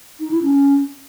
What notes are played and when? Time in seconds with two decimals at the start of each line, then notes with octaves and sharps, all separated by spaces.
0.20 D#4
0.31 E4
0.42 C#4